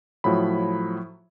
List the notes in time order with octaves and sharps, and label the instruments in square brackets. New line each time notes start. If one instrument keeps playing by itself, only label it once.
[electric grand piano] A2 F3 F#3 B5